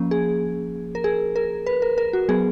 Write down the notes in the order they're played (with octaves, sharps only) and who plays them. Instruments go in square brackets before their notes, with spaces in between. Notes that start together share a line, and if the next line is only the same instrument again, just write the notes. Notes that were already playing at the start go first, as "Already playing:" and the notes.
Already playing: [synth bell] F3 A#3 C#4
G#4
A#4
G#4
A#4
B4
A#4
A#4
F#4
F#3 B3 G#4